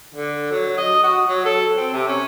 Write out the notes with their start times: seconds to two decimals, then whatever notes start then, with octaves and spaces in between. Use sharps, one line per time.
0.15 D3
0.51 F#3
0.78 D#5
1.03 F#4
1.28 F#3
1.45 A4
1.77 C4
1.93 C3
2.07 C#4